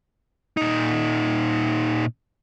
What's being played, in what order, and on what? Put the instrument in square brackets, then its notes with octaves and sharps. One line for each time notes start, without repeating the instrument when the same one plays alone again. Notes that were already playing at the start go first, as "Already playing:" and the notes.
[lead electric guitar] A#2 D#4